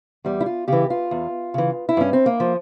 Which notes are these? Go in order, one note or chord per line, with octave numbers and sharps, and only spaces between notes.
E2 G3
E4
F4
C#3 E3 G4
F4
E2
C#3 E3
E4
G2 C#4
C4
A#3
F3